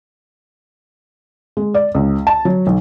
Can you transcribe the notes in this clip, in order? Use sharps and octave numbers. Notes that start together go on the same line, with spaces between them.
G#3
D5
C#2
A5
F#3
B1